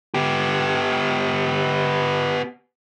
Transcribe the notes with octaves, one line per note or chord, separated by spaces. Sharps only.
B3 G4